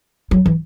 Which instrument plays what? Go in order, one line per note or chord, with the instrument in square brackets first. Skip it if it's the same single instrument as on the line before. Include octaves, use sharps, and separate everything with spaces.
[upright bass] F#3
E3